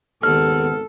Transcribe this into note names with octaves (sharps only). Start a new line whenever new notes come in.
G#1 D#2 C#3 B3 A4 F6